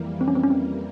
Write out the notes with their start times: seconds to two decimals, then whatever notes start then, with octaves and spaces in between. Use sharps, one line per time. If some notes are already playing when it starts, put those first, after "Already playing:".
Already playing: F2 E3 G3 A#3
0.21 C4
0.28 C#4
0.35 C4
0.43 C#4
0.50 C4